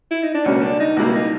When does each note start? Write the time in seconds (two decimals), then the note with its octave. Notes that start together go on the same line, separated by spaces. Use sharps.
0.11 E4
0.23 D#4
0.34 D4
0.46 C#2 B2 G3 A#3 C#4
0.63 D4
0.80 D#4
0.97 C#2 B2 G3 A#3 E4
1.14 D#4